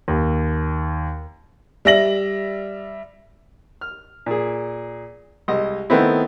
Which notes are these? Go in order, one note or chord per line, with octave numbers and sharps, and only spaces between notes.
D#2
G3 E5 A#6 F#7
F6
A#2 G#4
C2 G#3 D#5
D#3 A3 B3 C4 E4